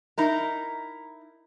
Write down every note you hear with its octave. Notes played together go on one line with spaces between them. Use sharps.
D#4 E4 A#4